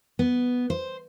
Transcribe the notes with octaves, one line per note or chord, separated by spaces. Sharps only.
B3
C5